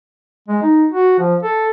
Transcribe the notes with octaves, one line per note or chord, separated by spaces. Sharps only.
G#3
D#4
F#4
F3
A4